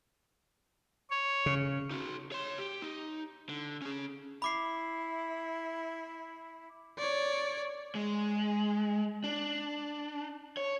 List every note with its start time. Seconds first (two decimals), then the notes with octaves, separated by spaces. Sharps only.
1.10 C#5
1.46 C#3
1.91 D#4 F#4
2.32 C#5 C6
2.59 G4
2.82 D#4
3.49 D3
3.82 C#4 G#4
4.42 E4 B5 D6 C7
6.98 C#5 D5
7.95 G#3
9.24 D4
10.57 C#5